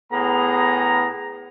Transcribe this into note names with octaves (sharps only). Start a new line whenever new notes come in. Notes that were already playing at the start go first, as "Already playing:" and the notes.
A2 B3 G#4 A#5